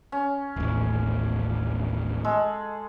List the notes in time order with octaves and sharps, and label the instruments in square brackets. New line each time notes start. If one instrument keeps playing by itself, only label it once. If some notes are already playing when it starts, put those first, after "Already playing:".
[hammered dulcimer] C#4
[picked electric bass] D#1 A1
[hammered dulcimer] G#3 A4